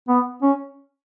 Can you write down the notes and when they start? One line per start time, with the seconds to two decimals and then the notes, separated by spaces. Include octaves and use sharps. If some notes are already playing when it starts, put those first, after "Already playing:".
0.08 B3
0.42 C#4